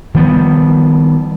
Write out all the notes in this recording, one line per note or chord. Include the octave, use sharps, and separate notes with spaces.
D#3 F3 G3 B3